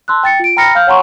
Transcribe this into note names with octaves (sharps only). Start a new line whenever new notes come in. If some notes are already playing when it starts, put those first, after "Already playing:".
A5 C6 E6 F#6
G5 A6 C#7
F4 D7
G5 A#5 B5 F6 A#6 C#7
F5 F6 G6
C#5 F#5 G#5 A#5 C6 C#6